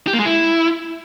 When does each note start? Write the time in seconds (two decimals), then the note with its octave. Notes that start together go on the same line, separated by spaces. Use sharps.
0.07 G4
0.13 A#3
0.19 G#3
0.25 E4